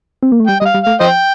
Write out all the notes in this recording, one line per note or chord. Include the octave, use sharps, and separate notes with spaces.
C4
A#3
A3
G3 G5
G3 D#5
F5
G3
A3 F5
F3 C5 D#5 G5